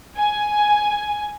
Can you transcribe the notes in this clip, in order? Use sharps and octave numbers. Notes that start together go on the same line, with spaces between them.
G#5